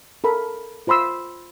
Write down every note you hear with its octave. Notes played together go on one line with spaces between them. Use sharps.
A4 A#4 B5
F4 C5 B5 C6 E6